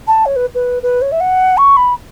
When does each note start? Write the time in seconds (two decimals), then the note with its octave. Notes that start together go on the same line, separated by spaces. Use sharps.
0.07 A5
0.25 C#5
0.35 B4
0.54 B4
0.82 B4
1.01 C#5
1.11 E5
1.20 F#5
1.57 C#6
1.76 B5